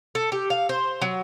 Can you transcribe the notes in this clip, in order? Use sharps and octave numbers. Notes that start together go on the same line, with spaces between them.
A4
G4
F5
C5
F#3